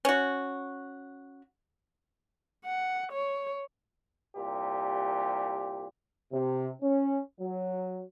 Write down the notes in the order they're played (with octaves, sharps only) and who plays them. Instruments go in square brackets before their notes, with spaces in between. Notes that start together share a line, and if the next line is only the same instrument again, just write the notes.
[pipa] C#4 F#4
[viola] F#5
C#5
[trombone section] C2 A#2 G4
C3
C#4
F#3